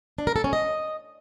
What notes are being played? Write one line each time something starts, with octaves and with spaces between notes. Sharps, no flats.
D4
A#4
A4
C#4
D#5